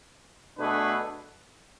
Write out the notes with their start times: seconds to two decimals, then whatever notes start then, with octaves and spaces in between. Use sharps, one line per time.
0.58 B2 A3 D4 G#4 B4